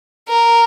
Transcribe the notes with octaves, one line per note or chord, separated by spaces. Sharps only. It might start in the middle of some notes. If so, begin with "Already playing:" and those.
A#4